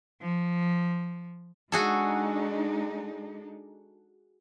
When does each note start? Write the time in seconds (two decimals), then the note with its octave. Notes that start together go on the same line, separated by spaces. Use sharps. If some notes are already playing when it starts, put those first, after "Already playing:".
0.21 F3
1.72 G#3 D4 D#4 F#4 G#4 A4